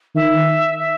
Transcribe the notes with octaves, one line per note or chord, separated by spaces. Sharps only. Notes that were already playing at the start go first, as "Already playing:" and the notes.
D#3 E5
E5